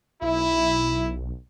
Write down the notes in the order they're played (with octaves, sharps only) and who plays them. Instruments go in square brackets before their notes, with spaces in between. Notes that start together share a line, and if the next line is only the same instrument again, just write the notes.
[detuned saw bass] B1 [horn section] E4